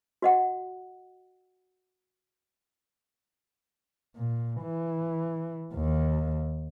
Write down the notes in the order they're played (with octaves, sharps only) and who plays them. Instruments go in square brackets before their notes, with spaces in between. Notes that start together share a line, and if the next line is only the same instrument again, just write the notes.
[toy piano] F#4 D#5 F#5
[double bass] A#2
E3
D#2